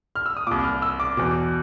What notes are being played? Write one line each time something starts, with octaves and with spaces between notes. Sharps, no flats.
F6
E6
D#6
C2 A#2 D6
F6
E6
D6
E2 B2 D6